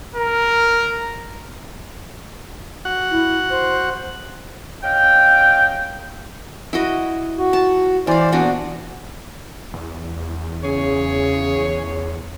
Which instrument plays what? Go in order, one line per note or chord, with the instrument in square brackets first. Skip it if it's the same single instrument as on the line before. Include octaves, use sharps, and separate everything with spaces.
[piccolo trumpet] A#4
[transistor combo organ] F#4 F#5
[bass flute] E4
C5
[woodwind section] C#4 D#5 F5 G5
[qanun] E4 F#4 D#5
[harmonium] F#4
[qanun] A5
[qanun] E3 F5 [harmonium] C5 D5
[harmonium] A#2 [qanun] B3 D4 F#4
[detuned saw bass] E2
[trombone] C#3 [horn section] G#4 C#5